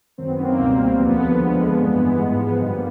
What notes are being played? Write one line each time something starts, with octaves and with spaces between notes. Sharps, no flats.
F#2 D#3 F#3 C4
B3
A#3 C4
C#2 B2 G3
D#2 D3 F3 B3
F2 D3 F3 G#3
G2 E3 G#3
G#2 F3 G#3
G2 D3 G3 B3
A#3